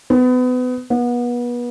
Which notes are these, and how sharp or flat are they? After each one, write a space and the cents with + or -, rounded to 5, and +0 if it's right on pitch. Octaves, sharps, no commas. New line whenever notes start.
B3 +30
B3 -30